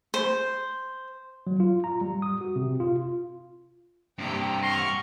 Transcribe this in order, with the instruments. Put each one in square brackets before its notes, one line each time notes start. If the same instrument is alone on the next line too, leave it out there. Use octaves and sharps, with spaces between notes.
[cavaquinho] C5
[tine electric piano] F#3
F4
A#5
G3
D#6
F#4
C3
F4
[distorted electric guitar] G2 C3 [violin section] G4 G5 A#5
[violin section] F#5 F6 [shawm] C#6 [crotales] A#6 C7 G7